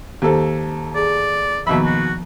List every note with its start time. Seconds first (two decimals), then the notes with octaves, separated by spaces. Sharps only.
0.22 D#2 G4 A4 C5
0.95 G#4 D5
1.67 D#2 B2 F3 E5 B5
1.85 F#4